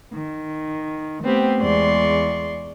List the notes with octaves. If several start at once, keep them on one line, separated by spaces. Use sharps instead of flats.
D#3
A3 B3 C4 G4
E2 G#3 D5 C6 C#6